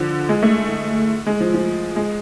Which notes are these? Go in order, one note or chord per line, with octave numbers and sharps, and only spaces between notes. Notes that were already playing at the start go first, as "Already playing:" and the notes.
Already playing: D3 F3
G#3
A3
G#3
F3
F3
G#3